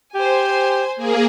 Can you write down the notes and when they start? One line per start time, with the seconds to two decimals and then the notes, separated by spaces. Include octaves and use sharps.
0.15 G4 C5 G#5
0.96 A#3 G#4